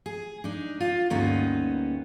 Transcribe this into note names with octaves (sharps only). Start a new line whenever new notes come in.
G#4
D4 D#4
F4
D2 G2 A#3 B3 C#4 D#4